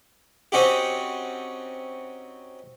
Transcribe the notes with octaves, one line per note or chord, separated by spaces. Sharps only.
C4 C#4 D#4 F#4 G4